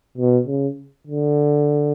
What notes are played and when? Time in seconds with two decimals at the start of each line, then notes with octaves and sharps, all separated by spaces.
0.18 B2
0.47 C#3
1.07 D3